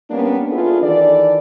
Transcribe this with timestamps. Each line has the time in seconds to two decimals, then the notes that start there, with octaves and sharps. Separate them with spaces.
0.10 G3 A#3 B3 C#4 D4
0.51 D4 E4 F4 G#4 A4 B4
0.82 D#3 E3 A4 D5